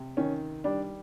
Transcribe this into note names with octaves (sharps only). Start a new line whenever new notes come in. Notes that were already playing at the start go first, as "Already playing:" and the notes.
Already playing: C3
D#3 C#4
G3 D4